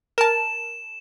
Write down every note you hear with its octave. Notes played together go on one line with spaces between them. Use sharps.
A#4 A5 E7